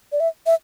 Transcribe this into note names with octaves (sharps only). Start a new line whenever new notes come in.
D5
E5
E5